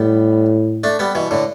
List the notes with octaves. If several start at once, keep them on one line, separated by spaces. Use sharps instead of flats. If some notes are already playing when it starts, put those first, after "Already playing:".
Already playing: A2 G3 B3
A3 D4
G3 B3
B2 E3
A2 D3